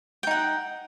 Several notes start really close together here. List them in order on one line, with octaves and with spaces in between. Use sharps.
G5 D#4 F#5